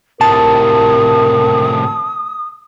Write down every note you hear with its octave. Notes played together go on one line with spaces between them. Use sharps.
A2 C3 A#4 A5 D#6